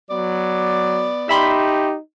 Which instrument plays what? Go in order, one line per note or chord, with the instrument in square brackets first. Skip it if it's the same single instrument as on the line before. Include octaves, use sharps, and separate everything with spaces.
[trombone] F#3 [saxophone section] B3 D5
[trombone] D#4 [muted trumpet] G4 [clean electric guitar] E5 B5 C6